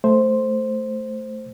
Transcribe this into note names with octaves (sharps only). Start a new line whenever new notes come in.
A3 C5